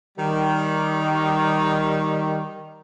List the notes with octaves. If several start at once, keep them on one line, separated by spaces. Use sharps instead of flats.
D#3 G3